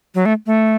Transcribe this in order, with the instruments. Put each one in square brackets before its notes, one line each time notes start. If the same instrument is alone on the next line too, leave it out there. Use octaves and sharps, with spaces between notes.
[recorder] F#3
A3
A3